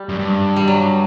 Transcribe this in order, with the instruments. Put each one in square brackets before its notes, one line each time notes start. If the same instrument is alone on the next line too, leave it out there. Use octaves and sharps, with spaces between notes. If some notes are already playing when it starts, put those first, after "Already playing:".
Already playing: [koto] G3
[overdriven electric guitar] F#2
G2
[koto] G3
F#3